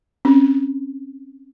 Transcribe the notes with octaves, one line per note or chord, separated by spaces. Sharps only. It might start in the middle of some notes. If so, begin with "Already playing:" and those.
C4 C#4